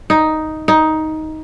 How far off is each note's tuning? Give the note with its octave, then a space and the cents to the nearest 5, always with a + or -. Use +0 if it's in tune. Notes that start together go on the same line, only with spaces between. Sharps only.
D#4 +5
D#4 +10